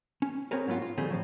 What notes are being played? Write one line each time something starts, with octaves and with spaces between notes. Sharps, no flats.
C#4
C4 C#4 G#4 A#4 B4
G#2 F#3 B3 F4
F4
D#3 F3 G3 A3 C4 G#4
A2 F3 F#3